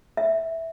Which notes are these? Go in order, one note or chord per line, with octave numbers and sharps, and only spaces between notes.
E5